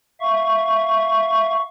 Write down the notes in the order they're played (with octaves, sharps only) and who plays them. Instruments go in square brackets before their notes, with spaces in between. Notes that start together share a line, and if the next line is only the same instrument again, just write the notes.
[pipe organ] E5 F5 C#6